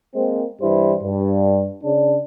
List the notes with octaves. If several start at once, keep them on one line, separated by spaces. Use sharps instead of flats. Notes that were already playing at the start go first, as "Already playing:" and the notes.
G#3 A#3 C4
G2 E3 G3 E4 C5
G2
C#3 D4